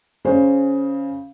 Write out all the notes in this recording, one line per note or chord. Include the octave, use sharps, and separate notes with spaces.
C#3 C#4 C5